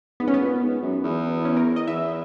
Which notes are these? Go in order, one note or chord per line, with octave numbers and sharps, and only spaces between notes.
G#2 B3
C#4
B3
A#2
G#2
F#2
E2
C#4
A#4
D#5
E2 E5